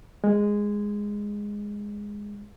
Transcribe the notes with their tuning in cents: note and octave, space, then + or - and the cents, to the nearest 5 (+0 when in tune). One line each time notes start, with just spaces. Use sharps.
G#3 -10